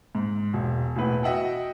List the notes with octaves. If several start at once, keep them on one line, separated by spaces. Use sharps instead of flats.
G#2
E1
E1 A2 E4 B4 F#5
F#4 D#5 E5 F#5 G5